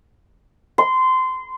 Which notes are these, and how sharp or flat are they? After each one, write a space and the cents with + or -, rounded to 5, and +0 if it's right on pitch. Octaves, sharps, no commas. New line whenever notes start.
C6 -20